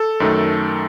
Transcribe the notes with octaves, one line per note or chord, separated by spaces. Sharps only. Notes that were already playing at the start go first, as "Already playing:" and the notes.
Already playing: A4
F#2 D#3 A3